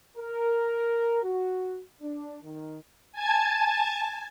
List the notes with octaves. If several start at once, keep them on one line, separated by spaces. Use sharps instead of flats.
A#4
F#4
D4
D#3
G#5 A5 G#6